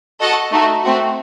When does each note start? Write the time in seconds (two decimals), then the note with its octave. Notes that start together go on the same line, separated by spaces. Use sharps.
0.21 F#4 A4 D#5 F#5 A5
0.52 A3 D#4 F#4
0.83 A3 C4 F#4